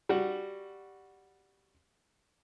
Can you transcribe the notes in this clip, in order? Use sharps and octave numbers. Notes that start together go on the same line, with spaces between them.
G3 F#4